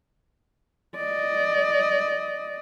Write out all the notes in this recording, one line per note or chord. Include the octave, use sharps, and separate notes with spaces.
D5 D#5